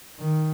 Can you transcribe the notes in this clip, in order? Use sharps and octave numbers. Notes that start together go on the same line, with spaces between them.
D#3